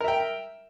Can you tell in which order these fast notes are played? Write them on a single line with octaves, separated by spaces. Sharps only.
A#4 E5 G5